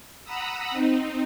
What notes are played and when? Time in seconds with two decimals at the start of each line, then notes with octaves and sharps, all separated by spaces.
0.24 F#5 A#5 B5 D#6 E6
0.71 C4 D#4